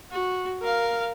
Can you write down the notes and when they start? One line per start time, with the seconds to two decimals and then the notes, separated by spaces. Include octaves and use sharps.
0.11 F#4
0.62 A#4 F5